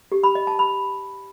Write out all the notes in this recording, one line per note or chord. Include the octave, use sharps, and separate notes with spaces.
G4
B5
D#5
A5
B5